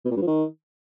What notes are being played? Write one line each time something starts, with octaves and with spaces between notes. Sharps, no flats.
B2
A#2
G2
F3
D#3